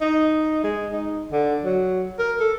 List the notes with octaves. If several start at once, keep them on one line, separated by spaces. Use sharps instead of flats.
D#4
G#3
D#4
D3
F#3
A#4
A4